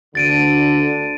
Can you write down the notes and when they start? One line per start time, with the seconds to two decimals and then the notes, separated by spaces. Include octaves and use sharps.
0.15 D2 D3 A6 D7 D#7